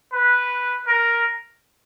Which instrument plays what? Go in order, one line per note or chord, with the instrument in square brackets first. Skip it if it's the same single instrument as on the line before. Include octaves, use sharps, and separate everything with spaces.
[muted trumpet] B4
A#4